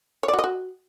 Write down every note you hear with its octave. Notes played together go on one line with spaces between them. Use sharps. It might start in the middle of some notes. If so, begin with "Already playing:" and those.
C#5
D5
F#4
D#5
F#4